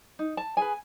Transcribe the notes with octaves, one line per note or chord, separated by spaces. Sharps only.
D#4
A5
G#4 B4 G#5